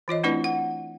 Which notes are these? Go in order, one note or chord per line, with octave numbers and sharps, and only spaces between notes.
E3 F4 C#5 D#5
A3 C4 D4 E4 B4 D5
F#5